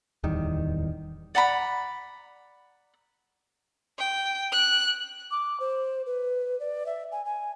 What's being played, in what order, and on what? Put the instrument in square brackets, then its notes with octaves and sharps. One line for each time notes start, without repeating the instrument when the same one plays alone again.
[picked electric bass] D1 E2 D#3 G3
[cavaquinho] D5 F#5 A#5 B5
[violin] G5
F#6
[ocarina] D6
C5
B4
D5
E5
G#5
G#5